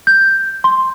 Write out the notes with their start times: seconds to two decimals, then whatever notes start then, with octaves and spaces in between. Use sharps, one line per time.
0.07 G6
0.64 C6